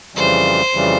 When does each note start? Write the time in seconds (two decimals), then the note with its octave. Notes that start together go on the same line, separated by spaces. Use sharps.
0.15 F2 C#3 E3 G3 C5
0.73 F2 C#3 E3 G3